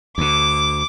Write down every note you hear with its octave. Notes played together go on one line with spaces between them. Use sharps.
D2 D3 D6